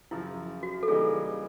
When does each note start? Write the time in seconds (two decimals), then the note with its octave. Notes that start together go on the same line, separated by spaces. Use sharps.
0.11 F#2 C#3 F3 E4
0.63 F#4
0.83 A4
0.88 C#3 E3 G3 A#3 D#4 G#4
1.14 G#4